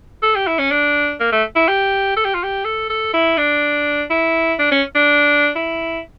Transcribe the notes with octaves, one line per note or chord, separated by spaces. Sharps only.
A4
G4
E4
C#4
D4
A#3
A3
E4
G4
A4
G4
F4
G4
A4
A4
E4
D4
E4
D4
C#4
D4
E4